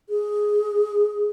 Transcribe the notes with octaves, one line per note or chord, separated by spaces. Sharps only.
G#4